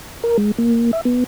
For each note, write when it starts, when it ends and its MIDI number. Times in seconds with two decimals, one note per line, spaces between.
0.24 0.37 70
0.37 0.51 56
0.58 0.91 58
0.93 1.01 76
1.05 1.24 59